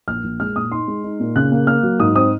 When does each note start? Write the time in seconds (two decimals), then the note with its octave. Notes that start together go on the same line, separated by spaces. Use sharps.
0.08 A#1 F6
0.24 A#1
0.40 G#3 F6
0.56 A#2 D#6
0.72 D#4 C6
0.88 G#3
1.04 D#4
1.20 A#2
1.36 C#3 F#6
1.52 A#3
1.67 A#3 F6
1.83 F#3
2.00 G#2 D#6
2.15 C4 D#6